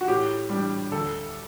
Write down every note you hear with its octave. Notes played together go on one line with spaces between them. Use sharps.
F#4
A2 G4
G3 D4
D2 A4